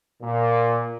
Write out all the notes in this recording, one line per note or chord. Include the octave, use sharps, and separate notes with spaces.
A#2